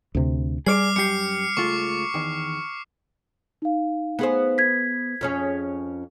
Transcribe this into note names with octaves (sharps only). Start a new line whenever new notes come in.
D2 C3
G3 G#4 C#5 D5 D6 F6 C7
F#2 G4 C7 C#7
C#2 A3 F4 C#6
E2 D#3
D#4 F5
B3 G#4 C5
G#6 B6
F2 C#4 G#4